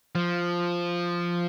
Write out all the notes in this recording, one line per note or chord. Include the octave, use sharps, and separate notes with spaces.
F3